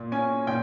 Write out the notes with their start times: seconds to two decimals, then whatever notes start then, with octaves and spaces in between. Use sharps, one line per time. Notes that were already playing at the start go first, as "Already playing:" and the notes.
Already playing: A#2
0.12 C#4 G#5
0.47 A#2 G5